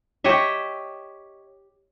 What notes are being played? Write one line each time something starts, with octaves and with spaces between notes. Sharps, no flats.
G4 C#5 D#5 E5